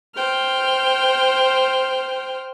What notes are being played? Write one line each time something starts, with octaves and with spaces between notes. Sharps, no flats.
C5 G5 F6